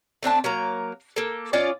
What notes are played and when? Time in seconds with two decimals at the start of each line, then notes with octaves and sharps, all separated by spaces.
0.23 A3 C4 D4 A5
0.44 F#3 A#3 A#5
1.16 A#3 A4
1.53 C#4 F4 D5 D#5